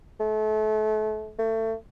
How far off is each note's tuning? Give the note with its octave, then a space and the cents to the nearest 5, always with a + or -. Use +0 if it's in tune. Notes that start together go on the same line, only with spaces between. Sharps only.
A3 -35
A3 +25